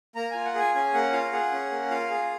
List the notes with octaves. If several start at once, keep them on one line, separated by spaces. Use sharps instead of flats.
A#3 A#5
F4 G#5
F#5
G#4 G#5
C#4 G#5
A#3 F#5
F4 F5
G#4 F#5
C#4
A#3
F4 F5
G#4